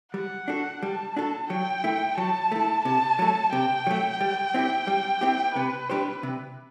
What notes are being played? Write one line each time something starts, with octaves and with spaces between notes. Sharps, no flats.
G3 F#5
D4 F#4 A4
G3 A5
D4 F#4 A4
F#3 G5
A3 E4
F#3 A5
A3 E4
C3 A5
F#3 A3
C3 G5
F#3 A3
G3
C4 E4 G4
G3
C4 E4 G4
C3 B4
G3 D4 G4 C5
C3